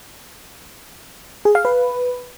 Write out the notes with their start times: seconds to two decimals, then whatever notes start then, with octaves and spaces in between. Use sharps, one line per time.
1.45 G#4
1.55 F5
1.65 B4